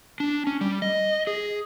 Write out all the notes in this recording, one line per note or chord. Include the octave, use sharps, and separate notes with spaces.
D4
C#4
G3
D#5
G#4